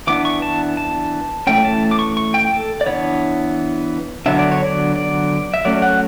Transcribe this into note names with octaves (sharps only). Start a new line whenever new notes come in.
E3 B3 D4 D6
C#6
A5
A5
E3 A3 C#4 G5
A5
D6
C#6
C#6
G5
A4
D5
E3 B3 D4 C#5
D3 F#3 B3 D4 E5
D5
C#5
D5
D5
E5
F#3 A3 C#4 D5
F#5